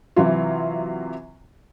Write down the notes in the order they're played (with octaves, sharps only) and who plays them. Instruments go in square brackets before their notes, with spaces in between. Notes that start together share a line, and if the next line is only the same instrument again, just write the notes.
[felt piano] C3 E3 F#3 F4